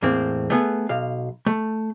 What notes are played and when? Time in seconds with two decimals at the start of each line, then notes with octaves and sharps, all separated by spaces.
0.02 E2 A2 A#3 C4
0.50 A3 B3 G#4
0.89 B1 F5
1.46 A3